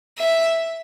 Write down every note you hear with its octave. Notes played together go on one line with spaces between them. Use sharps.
E5